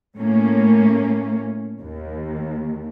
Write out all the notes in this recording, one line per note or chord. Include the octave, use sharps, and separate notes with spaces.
A2 A3 A#3 C#4
D#2